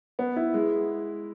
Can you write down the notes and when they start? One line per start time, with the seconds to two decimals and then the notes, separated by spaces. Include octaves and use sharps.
0.19 B3
0.36 E4
0.54 G#3